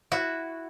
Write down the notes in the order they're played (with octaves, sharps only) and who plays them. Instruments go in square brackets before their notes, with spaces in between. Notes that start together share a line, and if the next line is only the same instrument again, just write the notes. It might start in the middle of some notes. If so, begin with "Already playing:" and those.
[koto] E4 F#4